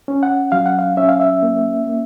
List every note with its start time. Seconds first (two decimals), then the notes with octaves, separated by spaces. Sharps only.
0.08 C#4
0.23 F#5
0.52 F#3 F5
0.66 F#5
0.79 F5
0.97 C#4 E5
1.09 F5
1.20 E5
1.43 A#3
1.87 A#3